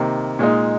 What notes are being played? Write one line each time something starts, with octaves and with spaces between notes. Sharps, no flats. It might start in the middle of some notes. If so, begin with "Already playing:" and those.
Already playing: C3 D#3 A#3
A#2 G#3 D#4